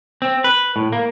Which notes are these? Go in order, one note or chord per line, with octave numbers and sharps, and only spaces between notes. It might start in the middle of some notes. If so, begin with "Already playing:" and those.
C4
B4
A2
A#3